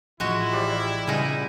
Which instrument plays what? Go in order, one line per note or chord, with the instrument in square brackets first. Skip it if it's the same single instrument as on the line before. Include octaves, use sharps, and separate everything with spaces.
[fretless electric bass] A1 F3 [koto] G#3 F#4 [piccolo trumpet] E4
[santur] G3 C5 D5
[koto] A#2 D#4 [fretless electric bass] C#3 G3 [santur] G#3 B3